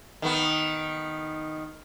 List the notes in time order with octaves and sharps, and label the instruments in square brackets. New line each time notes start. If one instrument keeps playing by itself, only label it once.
[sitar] D#3 B3